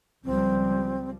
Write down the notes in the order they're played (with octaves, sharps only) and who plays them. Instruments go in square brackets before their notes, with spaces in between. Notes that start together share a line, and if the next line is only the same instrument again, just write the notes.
[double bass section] C#2 F3 G3 [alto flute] C4